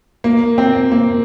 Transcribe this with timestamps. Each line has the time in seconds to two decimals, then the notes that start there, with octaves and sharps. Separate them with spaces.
0.24 A#3
0.58 C4
0.92 A#3